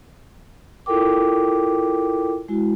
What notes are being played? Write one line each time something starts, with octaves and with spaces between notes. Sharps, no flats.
E4 F4 A4 A#4 G5 D6
G#3 E4 F#4